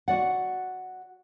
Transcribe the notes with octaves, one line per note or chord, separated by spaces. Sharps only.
F#4 D5 F#5